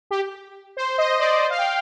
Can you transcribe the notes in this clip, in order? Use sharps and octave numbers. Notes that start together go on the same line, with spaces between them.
G4
C5
D#5
D5
C5
F5
G5